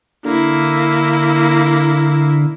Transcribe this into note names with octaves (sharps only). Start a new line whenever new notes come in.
D3 A#3 E4